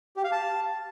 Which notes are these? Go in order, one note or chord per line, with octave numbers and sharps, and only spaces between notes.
G4
F5
A5